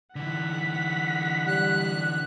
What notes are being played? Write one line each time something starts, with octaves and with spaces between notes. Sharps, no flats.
D3 E3 F#5 B6
G3 F#6